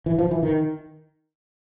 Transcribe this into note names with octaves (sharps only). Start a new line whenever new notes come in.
E3
F3
E3
D#3